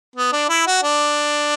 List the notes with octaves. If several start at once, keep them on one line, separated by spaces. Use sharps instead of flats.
B3
D4
E4
F#4
D4